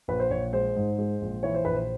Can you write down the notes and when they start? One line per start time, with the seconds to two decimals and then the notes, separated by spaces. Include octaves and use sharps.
0.08 A#1 B4
0.20 C5
0.30 A#1 C#5
0.53 G#3 C5
0.76 G#2
0.98 G#3
1.21 A#1
1.43 E3 C#5
1.54 C5
1.65 A#1 B4
1.75 C5